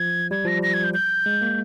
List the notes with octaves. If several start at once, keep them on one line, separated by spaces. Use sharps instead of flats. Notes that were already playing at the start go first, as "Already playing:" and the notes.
Already playing: F3 G#6
G3 G#6
F3 A#6
G3 A#6
G#6
G6
G6
G#3
A#3